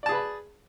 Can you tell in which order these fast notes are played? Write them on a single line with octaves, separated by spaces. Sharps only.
D5 A5 G#4 B4 B5